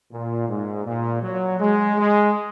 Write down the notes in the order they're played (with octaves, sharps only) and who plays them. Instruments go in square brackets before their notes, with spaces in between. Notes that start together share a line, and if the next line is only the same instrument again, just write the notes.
[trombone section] A#2
G#2
A#2
F#3
G#3
G#3